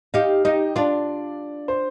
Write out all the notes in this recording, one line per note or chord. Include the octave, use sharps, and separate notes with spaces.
D#4 G4 F5
D#4 G4 D#5
D4 F4 D5
C5